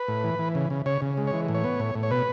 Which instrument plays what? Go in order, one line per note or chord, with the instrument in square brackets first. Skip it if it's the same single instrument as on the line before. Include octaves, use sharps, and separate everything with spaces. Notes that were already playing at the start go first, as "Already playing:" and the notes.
Already playing: [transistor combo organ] B4
A2
E3
E3
C#3
C#3
C#3 C#5
C#3
G#3
C#5
E3
A2
C#5
B3
A2
A2
C#5
B2 B4